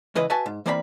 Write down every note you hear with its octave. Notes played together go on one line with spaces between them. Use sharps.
C#2 E3 B4 D#5
F#4 B4 E5 G#5 A5
G#2
E3 A#3 C4 D5 A5 B5